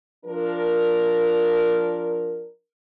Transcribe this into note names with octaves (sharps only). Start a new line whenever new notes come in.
F3 D4 A#4